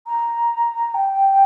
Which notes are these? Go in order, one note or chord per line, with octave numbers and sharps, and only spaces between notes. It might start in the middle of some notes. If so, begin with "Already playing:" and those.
A#5
G5